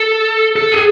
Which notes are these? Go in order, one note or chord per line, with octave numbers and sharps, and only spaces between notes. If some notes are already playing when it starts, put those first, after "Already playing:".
Already playing: A4
A4
G#4